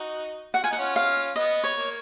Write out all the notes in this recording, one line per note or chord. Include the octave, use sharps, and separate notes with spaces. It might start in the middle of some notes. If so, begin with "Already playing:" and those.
Already playing: D#4 F#4
F#4 F#5
F4 G#5
D#4 F#5
C#4 F4
F5
B3 D#5
C#5
A#3